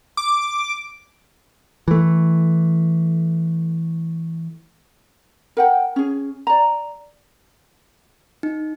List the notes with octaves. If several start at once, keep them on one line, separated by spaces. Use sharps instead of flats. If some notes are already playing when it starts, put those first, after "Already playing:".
D6
E3 A3
A#4 F#5 G5
C#4 G#4
D5 A#5
D#4